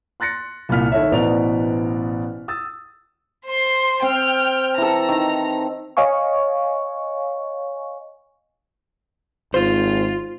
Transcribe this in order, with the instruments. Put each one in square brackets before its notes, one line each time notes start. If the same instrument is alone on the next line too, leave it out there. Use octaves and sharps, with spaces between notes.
[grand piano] C6 F#6 A6 A#6 C#7
C2 A#2 F5 F6 B6
D#3 A4 C#5 E5
A1 B2 C5 D5 A#5 F7
D#6 E6 A6
[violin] C5 C6
[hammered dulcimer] C4 [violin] G5 F6
[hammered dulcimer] E3 A4 [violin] A#5
[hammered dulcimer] D#3
[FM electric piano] C#5 D#5 F5 G#5 C#6
[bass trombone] G#1 [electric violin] F4 [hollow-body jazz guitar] C5